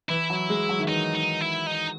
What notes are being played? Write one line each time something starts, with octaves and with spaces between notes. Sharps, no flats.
E3 E4
F#3
G#3
F#3
D#3
E3 D#4
D#4
E4
D#4